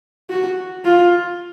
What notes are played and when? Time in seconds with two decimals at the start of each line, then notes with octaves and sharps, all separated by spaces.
0.30 F#4
0.85 F4